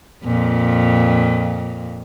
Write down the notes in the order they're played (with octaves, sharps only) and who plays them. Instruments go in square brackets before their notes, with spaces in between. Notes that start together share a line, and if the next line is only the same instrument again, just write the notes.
[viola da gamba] F2 A#2